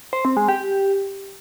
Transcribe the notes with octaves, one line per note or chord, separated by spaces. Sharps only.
C5
C4
G#3
G4